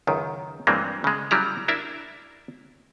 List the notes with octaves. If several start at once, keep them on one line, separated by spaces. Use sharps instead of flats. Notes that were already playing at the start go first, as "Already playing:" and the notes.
C#2 F#2 D#3
G2 E3 F#3 G#3 A#3 C4
C#3 G#3
C#3 F#3 G3 E4 A#5
D4 E4 A#4 E5